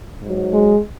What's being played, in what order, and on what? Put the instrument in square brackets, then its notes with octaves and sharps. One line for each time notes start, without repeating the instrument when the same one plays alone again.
[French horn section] G#2 F#3
G#3